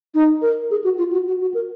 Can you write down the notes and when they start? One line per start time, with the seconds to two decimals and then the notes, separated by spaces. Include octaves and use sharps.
0.14 D#4
0.42 A#4
0.71 G#4
0.84 F#4
0.98 F4
1.13 F#4
1.27 F#4
1.41 F#4
1.54 A#4